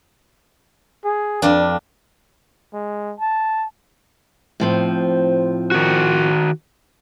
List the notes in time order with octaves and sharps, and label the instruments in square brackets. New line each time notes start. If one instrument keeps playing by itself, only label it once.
[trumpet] G#4
[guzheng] F2 D4 [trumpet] D5
[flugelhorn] G#3
A5
[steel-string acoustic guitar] A2 F3 C4
[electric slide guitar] D#3 F#4